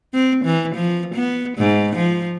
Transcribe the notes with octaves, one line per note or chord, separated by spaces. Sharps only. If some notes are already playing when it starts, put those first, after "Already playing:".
C4
E3
F3
B3
G#2
F3